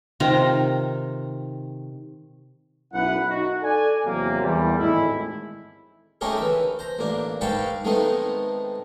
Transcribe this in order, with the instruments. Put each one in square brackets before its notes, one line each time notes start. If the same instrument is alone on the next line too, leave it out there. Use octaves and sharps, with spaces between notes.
[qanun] C3 D#3 F4 A#5
[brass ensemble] B1 F#2 E4 B4 F#5
D#4 F#4
A4 D5 G#5
E2 C3 F#3 A#3
E2 G3
G#1 A2 G#3 E4
[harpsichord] A3 C#4 D#4 G4 G#4 A#4
E3 E5
C5 A#5
A1 A#3 D4
G#2 B4 F5 G5 A5 C#6
D#3 G#3 A3 B3 C4 D#4